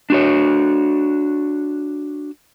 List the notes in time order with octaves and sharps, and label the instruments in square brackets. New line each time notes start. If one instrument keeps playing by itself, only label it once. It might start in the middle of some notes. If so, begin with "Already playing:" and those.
[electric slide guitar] D4 F#4 C#5